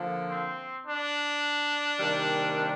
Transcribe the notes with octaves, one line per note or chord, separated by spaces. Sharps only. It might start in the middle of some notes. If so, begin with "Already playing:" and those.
Already playing: D3 F3 A#3
C4
D4
C3 D#3 G3 A#3